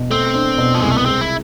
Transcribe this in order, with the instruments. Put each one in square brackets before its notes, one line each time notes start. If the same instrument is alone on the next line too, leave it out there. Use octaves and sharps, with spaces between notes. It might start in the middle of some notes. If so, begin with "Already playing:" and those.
Already playing: [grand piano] B2
[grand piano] A3 [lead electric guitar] C4
[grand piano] D4
B2
[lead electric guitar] F3
[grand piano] C2 [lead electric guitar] G#3
[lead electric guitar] A3
B3
[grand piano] G#3 [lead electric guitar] C4
[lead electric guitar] E4